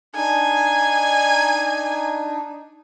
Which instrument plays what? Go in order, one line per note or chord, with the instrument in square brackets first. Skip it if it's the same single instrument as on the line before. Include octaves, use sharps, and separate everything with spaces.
[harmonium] D4 D#4 [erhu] G#5